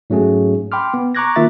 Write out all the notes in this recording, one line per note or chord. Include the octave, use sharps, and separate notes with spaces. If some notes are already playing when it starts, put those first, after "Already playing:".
G#2 F#3 A3 C#4 G#4
G5 B5 C6 D6 F6
B3
A#5 C#6 D6 F#6 G#6 A#6
D#3 A#3 F4 E5 A6